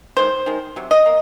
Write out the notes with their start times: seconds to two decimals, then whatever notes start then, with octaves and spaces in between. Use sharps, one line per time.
0.17 D#3 G#3 C5
0.46 D#3 G#3
0.76 C3 F#3
0.91 D#5
1.06 A#3